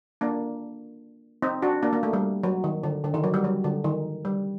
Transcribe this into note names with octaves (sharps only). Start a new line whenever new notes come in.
A#3 D4
C4 D#4
D4 F#4
A#3 D4
A#3
A3
G3
F#3
D#3
D3
D3
D#3
F#3
G3
F#3
D3
D#3
G3